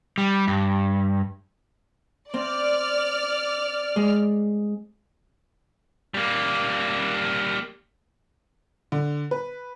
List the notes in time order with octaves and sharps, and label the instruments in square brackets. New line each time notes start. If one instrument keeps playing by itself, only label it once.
[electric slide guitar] G3
G2
[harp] C4 [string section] D5 F6
[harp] G#3
[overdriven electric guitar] G3 A#3
[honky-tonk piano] D3
B4